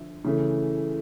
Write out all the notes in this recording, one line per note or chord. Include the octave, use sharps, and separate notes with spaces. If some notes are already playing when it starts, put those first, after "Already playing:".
Already playing: D3 F3 E5
C#3 E3 A3